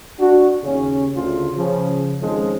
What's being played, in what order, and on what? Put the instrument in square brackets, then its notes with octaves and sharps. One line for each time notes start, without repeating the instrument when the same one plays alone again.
[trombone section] D4 F#4
D#2 C#3 C#4
D2 C#3 F4
C#3 F3
F2 D#3 F3 G#3 C#4